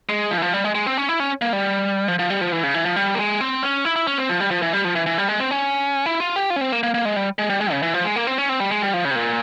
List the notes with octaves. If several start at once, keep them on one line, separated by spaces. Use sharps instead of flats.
G#3
F3
E3
F3
G3
G#3
G#3
C4
C#4
E4
C#4
A#3
G3
F3
F3
G3
F3
E3
C#3
E3
F3
G3
A#3
G#3
C4
C#4
E4
E4
C#4
C4
F3
G3
F3
E3
G3
F3
E3
E3
G3
G#3
C4
C#4
E4
F4
G4
F4
C#4
C4
A#3
A#3
A#3
G#3
G3
G#3
G3
G#3
C#3
E3
F3
G#3
A#3
C4
C#4
C4
G3
G#3
G3
F3
C#3
C3
A#2